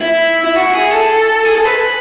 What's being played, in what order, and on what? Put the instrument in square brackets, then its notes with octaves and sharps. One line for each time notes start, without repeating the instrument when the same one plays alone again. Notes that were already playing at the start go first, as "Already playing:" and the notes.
[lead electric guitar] E4
E4
F#4
G#4
A4
G#4
A4
B4